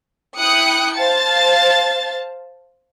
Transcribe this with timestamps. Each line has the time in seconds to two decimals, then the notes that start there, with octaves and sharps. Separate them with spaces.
0.38 E4 G5 D#6 F#6 C#7
0.97 C5 F5 A5 A6